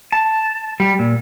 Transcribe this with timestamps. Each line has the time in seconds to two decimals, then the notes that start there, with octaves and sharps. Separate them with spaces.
0.12 A5
0.80 G3
0.99 A#2